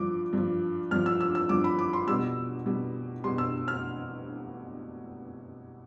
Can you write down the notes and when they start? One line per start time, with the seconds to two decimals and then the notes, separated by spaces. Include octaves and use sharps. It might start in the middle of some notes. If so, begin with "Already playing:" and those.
Already playing: G2 F3 D6
0.33 G2 F3
0.91 G2 F3 F6
1.06 E6
1.21 E6
1.35 E6
1.49 G2 F3 D6
1.64 B5
1.79 D6
1.93 C6
2.08 B2 G3 E6
2.66 B2 G3
3.24 B2 G3 C6
3.38 E6
3.68 F6